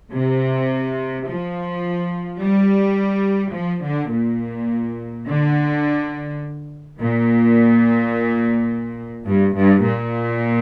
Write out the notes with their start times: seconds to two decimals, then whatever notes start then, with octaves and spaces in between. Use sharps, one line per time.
0.12 C3
1.26 F3
2.41 G3
3.55 F3
3.85 D3
4.13 A#2
5.28 D3
6.99 A#2
9.27 G2
9.56 G2
9.84 A#2